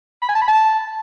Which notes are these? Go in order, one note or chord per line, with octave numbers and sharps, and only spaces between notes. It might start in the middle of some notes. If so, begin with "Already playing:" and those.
B5
G#5
A5
B5
A5